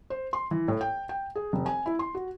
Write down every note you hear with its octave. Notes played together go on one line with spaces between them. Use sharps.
C5
C6
E3
A2
G5
G5
G#4
F1
G#5
E4
C6
F#4